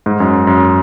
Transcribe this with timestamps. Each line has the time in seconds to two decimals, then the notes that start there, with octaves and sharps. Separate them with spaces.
0.06 G#2
0.20 F#2
0.47 F#2